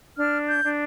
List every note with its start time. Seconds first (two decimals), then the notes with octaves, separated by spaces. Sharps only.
0.18 D4 F6
0.48 G6
0.64 D4